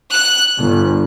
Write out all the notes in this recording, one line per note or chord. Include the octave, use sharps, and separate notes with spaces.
F#6
G1